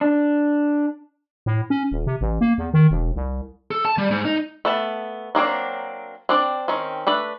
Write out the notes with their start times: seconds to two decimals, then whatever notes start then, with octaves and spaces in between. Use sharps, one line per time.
0.01 D4
1.46 A2
1.70 C#4
1.92 D#1
2.06 C3
2.21 A1
2.41 A#3
2.58 E2
2.74 D#3
2.91 E1
3.16 C2
3.71 A4
3.85 A5
3.98 G3
4.11 G#2
4.25 D#4
4.65 A3 B3 A5
5.35 F#3 A#3 C4 D4
6.29 C4 D4 D5
6.68 D#3 C4 C#4
7.07 A3 D4 B4